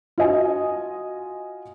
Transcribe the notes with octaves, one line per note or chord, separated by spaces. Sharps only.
F4 F#4 D#5 G#5